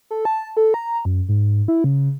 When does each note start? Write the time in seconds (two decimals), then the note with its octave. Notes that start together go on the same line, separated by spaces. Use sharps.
0.11 A4
0.25 A5
0.57 A4
0.74 A#5
1.05 F#2
1.29 G#2
1.68 E4
1.84 C#3